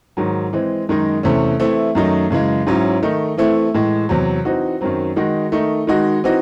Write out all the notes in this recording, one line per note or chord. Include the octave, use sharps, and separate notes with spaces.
G#2 D#3 F#3
E3 G#3 C4
F#2 D#3 G#3 D#4
E2 C3 E3 A3 C#4
E3 A3 C4 E4
F#2 D#3 F#3 A3 D#4
F#2 C#3 E3 G#3
G#2 F#3 C#4 E4
D#3 A3 D#4
E3 A3 C4 E4
A2 E3 G#3
E2 C3 F#3
E3 C4 D#4 F#4
F#2 D#3 F#3 C4
D#3 G#3 D#4 F#4
D#3 A3 D#4
D#3 G#3 D#4 F#4
E3 C4 D#4 F#4